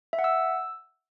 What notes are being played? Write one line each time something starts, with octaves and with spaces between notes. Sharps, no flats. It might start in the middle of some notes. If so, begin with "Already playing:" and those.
E5
F#5
E6